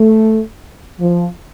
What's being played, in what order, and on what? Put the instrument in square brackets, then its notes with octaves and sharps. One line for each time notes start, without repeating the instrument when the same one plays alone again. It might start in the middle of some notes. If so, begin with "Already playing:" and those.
Already playing: [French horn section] A3
F3